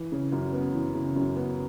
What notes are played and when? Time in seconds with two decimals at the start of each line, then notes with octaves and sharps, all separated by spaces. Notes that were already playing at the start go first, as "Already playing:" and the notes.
Already playing: E3
0.12 C#3
0.32 F#2
0.53 B3
0.74 E3
0.94 C#3
1.16 F#2
1.37 B3